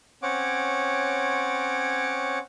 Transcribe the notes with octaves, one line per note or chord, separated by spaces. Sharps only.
C4 C#4 C#5 F#5 D6